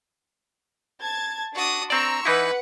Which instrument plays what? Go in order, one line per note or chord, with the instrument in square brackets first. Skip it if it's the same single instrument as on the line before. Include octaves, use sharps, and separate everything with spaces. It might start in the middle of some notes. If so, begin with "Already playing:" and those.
[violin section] A5 G#6 A6
[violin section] D4 A6 [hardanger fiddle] F#4 D#6
[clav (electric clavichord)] C4 D5 [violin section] A#5 C6 E6 [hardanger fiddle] C#6
[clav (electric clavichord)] E3 D#4 E4 [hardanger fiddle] B4 [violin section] F#5